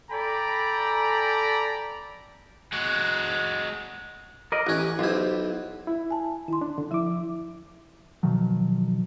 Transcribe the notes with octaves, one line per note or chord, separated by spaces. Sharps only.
A4 D5 G5 G#5 A#5 B5
G#3 F#4
A#4 D5 D#5
A1 C#4 G4 F#6
B1 E4 F4 G4 C5
E4
G#5 A5
D#3 E4 C6
D4
D3
F3 E4 E5 D6
B2 D#3 F3 F#3